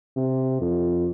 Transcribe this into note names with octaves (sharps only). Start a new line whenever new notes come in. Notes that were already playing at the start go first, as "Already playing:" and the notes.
C3
F2